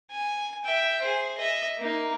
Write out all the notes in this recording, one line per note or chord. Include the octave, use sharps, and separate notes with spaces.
G#5
E5 G5
G#4 C5
D#5 E5
A#3 D#4